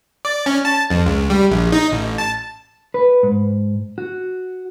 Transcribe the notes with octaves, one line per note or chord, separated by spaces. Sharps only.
D5
C#4
A5
F2
C#2
G3
A#1
D#4
A1
A5
B4
G#2
F#4